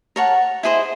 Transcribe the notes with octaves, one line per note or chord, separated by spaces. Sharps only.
A#4 C#5 F#5 A5
E4 G#4 C5 D#5